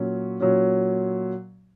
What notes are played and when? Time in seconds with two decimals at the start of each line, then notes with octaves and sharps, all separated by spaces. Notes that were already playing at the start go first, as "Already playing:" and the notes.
Already playing: A#2 F#3 C#4
0.40 A#2 F#3 C#4